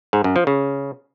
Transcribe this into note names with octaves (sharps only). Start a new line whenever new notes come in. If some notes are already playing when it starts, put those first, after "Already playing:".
G#2
F#2
F3
C#3